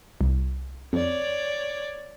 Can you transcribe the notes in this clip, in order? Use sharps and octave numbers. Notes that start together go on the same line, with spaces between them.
C2
F2 C#5 D5